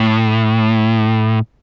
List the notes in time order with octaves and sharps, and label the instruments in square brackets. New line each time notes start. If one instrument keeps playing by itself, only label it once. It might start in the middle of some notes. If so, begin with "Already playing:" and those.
Already playing: [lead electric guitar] A2